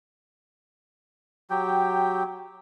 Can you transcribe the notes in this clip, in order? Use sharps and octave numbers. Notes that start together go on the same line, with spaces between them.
F#3 G4 G5